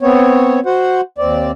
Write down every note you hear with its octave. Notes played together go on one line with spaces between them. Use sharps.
B3 C4 C#5
F#4 C5 F#5
D#2 C4 D5